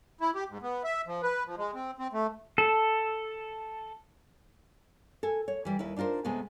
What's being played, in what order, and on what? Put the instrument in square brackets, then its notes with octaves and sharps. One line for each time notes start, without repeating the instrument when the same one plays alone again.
[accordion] E4
G4
G#2
B3
E5
F3
B4
F3
G#3
C4
C4
A3
[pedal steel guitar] A4
[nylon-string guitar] A4 G#5
C#5
E3 G3
D#2 E4 B4
D4 D#4 F4 A#4 C5
C3 G#3 A3 B3 B4